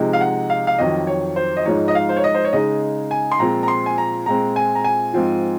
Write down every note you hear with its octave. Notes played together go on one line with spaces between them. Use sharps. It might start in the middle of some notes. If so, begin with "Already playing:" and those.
Already playing: C3 F3 G#3 D#4
F5
F#5
F5
F5
F2 D#3 F#3 D#5
C#5
C5
D#5
G#2 F3 G#3 D#4 C#5
D#5
F5
C5
C#5
D#5
C5
C#5
C#3 G#3 D#4 D#5
G#5
C6
A#2 F3 G#3 C4 F4 A#5
A#5
C6
G#5
A#5
A#2 G#3 C4 A#5
G#5
A#5
G#5
G#2 F3 C4 F4